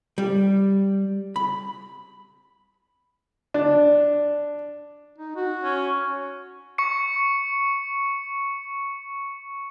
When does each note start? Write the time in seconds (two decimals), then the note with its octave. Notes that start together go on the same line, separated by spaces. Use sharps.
0.18 G3
1.36 B5
3.54 D4
5.18 D#4
5.36 F#4
5.64 C#4
6.78 C#6 C#7